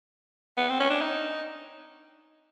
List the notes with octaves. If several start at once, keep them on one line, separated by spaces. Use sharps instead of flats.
B3
C4
C#4
D4
D#4